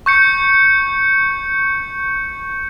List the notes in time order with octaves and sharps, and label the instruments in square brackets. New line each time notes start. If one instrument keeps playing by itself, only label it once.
[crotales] C#6 G6 C#7